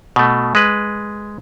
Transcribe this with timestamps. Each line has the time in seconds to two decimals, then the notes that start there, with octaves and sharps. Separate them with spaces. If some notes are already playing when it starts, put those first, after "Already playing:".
0.16 B2 A3
0.55 G#3 B4